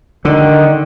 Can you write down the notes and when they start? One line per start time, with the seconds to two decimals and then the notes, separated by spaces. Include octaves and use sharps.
0.25 D3 D#3